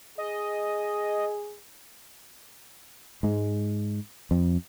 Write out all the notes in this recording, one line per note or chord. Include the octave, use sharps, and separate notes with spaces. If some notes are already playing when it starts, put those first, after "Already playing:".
G#4 D#5
G#2 G#3
F2